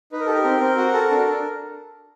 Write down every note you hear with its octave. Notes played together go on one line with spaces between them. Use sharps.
D#4 B4
A#4
G4 A4
A#4
C4
C4
F#4
A4
D4
D4